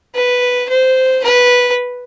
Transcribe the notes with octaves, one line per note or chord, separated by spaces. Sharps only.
B4
C5
B4